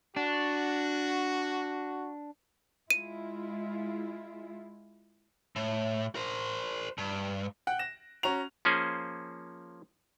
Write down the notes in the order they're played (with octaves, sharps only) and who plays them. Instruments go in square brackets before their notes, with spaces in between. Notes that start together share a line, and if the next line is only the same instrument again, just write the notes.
[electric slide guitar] D4 [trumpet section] F#4
[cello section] G#3 E4 F4 [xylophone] D#7
[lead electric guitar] A2
A#4 C5
G2
[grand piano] F#5 G5 F#6
A#6 E7
C#4 F#4 A#5 F7
[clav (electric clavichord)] F3 A#3 C#4 G#4 C5